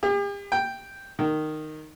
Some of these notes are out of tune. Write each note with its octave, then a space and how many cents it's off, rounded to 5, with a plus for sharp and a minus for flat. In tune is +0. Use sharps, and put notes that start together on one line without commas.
G4 +45
G5 +0
D#3 -10